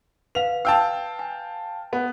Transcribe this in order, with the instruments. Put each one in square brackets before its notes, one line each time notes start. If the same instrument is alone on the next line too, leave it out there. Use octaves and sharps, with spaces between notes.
[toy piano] B4 F5 [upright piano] F7
[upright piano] F5 G5 A5 [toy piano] E6
[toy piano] G#5
[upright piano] B3